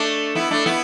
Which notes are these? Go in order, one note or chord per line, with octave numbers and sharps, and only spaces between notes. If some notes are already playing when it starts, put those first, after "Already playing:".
Already playing: A3 D4
B3 E4
A3 D4
B3 E4